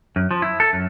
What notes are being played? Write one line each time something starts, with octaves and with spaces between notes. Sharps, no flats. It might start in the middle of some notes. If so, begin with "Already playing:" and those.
F#2
F3
E4
A4
F#2